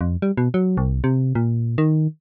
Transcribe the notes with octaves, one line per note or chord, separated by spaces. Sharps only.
F2
G3
B2
F#3
C2
C3
A#2
D#3